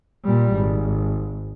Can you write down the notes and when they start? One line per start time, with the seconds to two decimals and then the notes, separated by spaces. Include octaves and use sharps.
0.25 A#2 G3
0.54 G#1